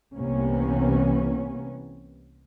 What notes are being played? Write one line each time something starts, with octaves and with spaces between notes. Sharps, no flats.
C2 C3 E3 A#3 B3 C#4